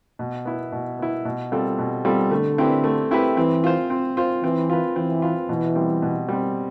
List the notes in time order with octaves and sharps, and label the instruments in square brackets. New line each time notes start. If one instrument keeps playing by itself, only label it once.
[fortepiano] B2
B3 E4
B2
B3 E4
B2
G3 C4 F4 A4
B2
G3 C4 F4 A4
[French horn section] D3 [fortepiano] A3
[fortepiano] C4 E4 G4 B4
A3
C4 E4 G4 B4
[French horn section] E3 [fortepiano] C4
[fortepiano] F4 C5
C4
F4 C5
[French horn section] E3 [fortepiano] C4
[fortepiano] F4 B4
[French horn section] E3 [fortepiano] C4
[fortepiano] F4 B4
[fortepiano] B2 [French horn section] E3
[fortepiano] G3 C4
B2
G3 C4